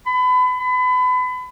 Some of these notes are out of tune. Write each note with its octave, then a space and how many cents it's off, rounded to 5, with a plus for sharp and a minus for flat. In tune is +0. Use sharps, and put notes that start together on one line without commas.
B5 +30
B5 +30